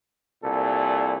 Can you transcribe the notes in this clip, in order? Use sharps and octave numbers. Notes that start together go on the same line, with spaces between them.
C2 A#2 A4